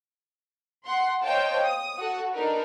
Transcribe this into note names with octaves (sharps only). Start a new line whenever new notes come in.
F#5 C6
C5 C#5 D#5 F5 G5 A5
D#6
F#4 A4 F#5
D4 D#4 A#4 B4